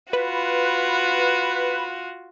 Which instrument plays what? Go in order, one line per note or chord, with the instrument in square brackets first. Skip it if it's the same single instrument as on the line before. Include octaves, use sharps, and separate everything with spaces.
[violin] F4 F#4 [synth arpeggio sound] B4